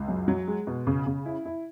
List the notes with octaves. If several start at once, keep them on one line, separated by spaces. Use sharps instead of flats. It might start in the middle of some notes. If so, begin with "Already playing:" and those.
Already playing: C#2
F#2
F#3
G#3
B2
C#3
C#3
E4
E4